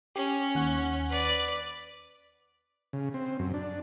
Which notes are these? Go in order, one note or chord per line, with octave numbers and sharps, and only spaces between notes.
C#4 G4
D#2 F#5
B4 D5
C#3
C4
F#2
D4